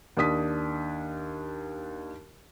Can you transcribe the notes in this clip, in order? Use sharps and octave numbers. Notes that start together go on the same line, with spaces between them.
D#2 D4 D#6 B6